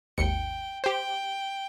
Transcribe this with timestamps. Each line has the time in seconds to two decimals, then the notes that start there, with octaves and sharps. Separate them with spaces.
0.18 G#1 D#2 G5 C#7
0.84 G4 C5 G5